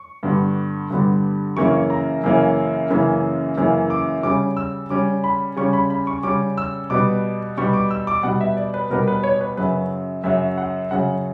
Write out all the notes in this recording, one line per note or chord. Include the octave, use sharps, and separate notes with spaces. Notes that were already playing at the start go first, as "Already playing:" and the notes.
Already playing: C#6
G2 D3 G3 B3
G2 D3 G3 B3
F#2 C#3 E3 A#3 C#4 C#6
A#5
F#2 C#3 E3 A#3 C#4
F#2 C#3 E3 A#3 C#4
F#2 C#3 E3 A#3 C#4
D6
C#3 G3 C#4 D6
E6
C#3 G3 C#4 D6
B5
C#3 G3 C#4 C#6
B5
B5
C#6
C#3 G3 C#4 D6
E6
B2 G3 B3 D6
B2 G3 B3 C#6
D6
E6
D6
B2 G3 B3 F#5
E5
D5
B4
B2 G3 B3 A#4
B4
C#5
B4
F#2 C#3 F#3 B4
F#2 C#3 F#3 E5
F#5
F#2 C#3 F#3 F#5